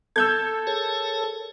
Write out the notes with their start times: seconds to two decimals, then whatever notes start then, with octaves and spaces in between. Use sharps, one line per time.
0.16 A4 E6 G6 G#6
0.67 G#4 A#4 C#5